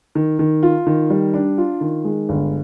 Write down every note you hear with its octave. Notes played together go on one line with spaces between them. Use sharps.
D#3
D#3
F4
D#3
G3
D4
F4
D#3
G#3
G1